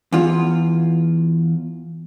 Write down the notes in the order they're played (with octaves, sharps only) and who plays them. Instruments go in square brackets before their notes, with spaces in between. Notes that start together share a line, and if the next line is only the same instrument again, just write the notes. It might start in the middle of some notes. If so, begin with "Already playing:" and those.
[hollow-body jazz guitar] E2 F4